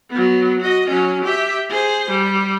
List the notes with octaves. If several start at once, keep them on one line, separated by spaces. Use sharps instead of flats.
F#3 B3
F#4 D#5
F#3 C#4
G4 E5
G#4 C5
G3